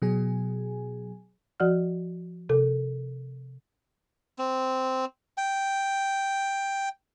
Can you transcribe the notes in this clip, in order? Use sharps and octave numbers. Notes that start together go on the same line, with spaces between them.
B2 F#3 G#4 G#5
F3 F#4 D5 F#5 F6
C3 A4
C4
G5